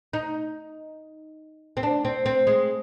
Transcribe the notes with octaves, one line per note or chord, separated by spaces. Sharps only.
D#4
C4
D4
C4
C4
G#3